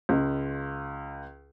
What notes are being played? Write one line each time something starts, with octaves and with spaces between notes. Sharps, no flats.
C#2